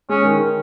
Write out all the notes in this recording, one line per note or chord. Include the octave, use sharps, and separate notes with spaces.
G#3 C#4
D#3